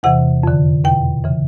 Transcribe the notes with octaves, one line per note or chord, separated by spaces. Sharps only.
E2 C3 E3 F#5
F2 D3
E2 B2 G5
C#3 E3